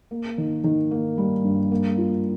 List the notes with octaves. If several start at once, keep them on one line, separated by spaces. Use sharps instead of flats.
A#3
D#3
D#3
A#3
G3
G2
A#3
F4